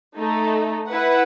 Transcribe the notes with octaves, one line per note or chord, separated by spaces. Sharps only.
A3 D#4 A4
E4 B4 F#5